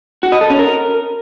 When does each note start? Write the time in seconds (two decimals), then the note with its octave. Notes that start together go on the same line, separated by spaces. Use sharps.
0.23 F#4
0.32 D#5
0.41 A4
0.50 C#4
0.59 A#4